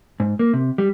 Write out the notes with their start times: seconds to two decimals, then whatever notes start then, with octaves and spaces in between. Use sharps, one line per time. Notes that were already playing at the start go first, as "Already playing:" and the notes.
0.20 G#2
0.39 A#3
0.53 C3
0.78 G3